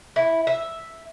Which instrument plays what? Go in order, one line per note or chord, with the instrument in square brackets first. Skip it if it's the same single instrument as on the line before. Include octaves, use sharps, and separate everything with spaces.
[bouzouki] E4
E5